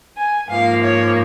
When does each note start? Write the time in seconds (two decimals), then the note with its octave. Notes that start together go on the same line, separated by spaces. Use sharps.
0.16 G#5
0.50 G#2 F3 A#3 F5
0.84 C#5